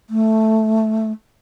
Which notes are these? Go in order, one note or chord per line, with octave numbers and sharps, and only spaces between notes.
A3